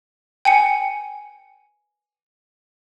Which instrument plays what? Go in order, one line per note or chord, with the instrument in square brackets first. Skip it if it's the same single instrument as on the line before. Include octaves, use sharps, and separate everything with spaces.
[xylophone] G5 G#5 C#7